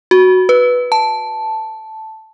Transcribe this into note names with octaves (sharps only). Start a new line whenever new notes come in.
F#4
B4
A5